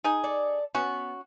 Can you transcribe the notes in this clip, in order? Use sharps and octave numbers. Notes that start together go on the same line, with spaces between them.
D#4 G#4
A4 D5
B3 C#4 F#4